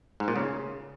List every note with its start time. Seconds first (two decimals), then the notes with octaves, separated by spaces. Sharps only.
0.20 G#2
0.28 A#2
0.36 C#3